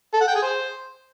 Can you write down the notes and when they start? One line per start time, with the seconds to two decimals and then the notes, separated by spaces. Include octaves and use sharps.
0.14 A4
0.21 F#5
0.28 G5
0.35 G#4
0.42 C5